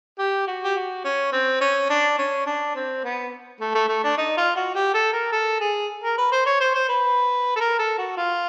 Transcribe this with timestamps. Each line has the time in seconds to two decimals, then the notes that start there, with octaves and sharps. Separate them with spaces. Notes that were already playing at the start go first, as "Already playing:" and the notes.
0.19 G4
0.47 F#4
0.64 G4
0.76 F#4
1.04 C#4
1.32 C4
1.61 C#4
1.89 D4
2.18 C#4
2.46 D4
2.75 C4
3.04 B3
3.60 A3
3.75 A3
3.89 A3
4.04 D4
4.18 D#4
4.37 F4
4.56 F#4
4.75 G4
4.94 A4
5.13 A#4
5.32 A4
5.60 G#4
6.04 A#4
6.18 B4
6.32 C5
6.46 C#5
6.60 C5
6.75 C5
6.89 B4
7.56 A4
7.60 A#4
7.79 A4
7.98 F#4
8.17 F4